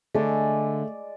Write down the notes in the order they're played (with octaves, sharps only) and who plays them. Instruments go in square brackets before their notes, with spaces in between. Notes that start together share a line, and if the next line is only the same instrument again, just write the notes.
[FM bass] D3 [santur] G#3 D5 [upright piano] A3